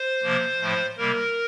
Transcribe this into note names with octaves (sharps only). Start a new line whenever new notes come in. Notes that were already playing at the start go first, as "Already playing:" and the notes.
Already playing: C5
C3 F3 A#3
A2 F3 A3
C3 G3 A#3 A#4